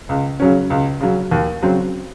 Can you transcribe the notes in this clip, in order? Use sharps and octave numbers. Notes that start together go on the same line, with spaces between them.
C#2
C#3 F#3 C#4
C#2
C#3 F#3 C#4
D#2
C#3 F#3 C4